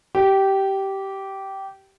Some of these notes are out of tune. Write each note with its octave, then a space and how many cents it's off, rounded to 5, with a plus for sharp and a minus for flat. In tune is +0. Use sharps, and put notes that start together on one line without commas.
G4 -15